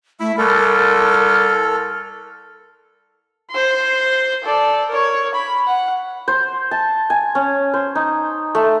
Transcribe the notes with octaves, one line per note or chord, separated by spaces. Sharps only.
A3 E4 E5
C2 A4 A#4 F6
C5 C6
A4 D5
A#4 C#5
B5
F#5
C5
A5
G#5
C#4
C5
D#4
A3